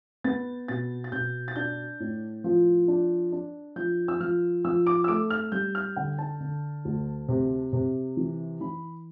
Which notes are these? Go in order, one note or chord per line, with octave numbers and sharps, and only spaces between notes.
B3 A6
B2 A6
A6
B2 G6
A6
D4 G6
A2
F3
D4
D4
F3 G6
E6
F3 F6
F3 E6
D6
E6
A3 D6
F6
G3 G6
F6
D3 G5
A5
D3
D2
C3
C3
E3
E3 B5